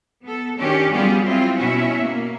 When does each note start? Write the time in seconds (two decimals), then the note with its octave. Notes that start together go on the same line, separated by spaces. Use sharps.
0.24 B3 A4
0.59 D#3 C#4 D4 G4
0.92 F#3 G3 B3 F4 G4 G#4
1.25 C4 E4 F4
1.59 B2 C#4 E4 F#4 E5
2.01 A#3